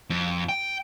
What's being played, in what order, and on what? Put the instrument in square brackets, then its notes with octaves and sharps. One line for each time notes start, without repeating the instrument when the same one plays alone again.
[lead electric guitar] F2
G5